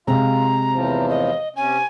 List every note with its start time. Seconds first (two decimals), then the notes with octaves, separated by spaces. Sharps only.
0.07 C3 G#3 F4 A#5
0.71 E2 A2 F3
1.09 D#5
1.56 C3 C#4 G#5